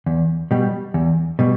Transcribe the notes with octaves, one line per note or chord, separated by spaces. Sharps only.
E2
B2 G3
E2
B2 G3